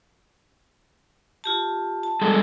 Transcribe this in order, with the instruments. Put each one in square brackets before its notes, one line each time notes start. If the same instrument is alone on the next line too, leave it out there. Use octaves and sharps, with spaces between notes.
[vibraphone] F4 G4 A5
A5
[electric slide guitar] G3 G#3 A4